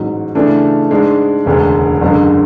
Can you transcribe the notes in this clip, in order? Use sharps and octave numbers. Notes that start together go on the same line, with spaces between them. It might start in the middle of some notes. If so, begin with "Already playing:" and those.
Already playing: A1 G#2 F#3
C#3 E3 A3 D4 A4
G#2 G#3 D4
E1 D2 C#3 G#3 B3
F#1 F#2 D3 G#3